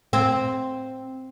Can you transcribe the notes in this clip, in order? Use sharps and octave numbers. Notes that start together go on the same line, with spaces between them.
C4